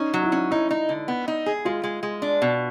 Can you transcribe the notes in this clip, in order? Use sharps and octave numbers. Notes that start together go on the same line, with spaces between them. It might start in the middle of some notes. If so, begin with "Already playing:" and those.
Already playing: C#4 D#4
F#3
E4
C#4
D#4 E4
D#4
D3
B3
D#4
G#4
G#3 F4
G#3
G#3
D4
B2